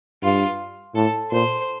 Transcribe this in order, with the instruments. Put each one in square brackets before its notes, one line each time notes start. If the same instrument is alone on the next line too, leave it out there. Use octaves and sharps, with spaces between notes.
[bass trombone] G2 [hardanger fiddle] F4
[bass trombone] A2 [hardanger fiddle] A4
[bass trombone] A#2 [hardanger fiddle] C5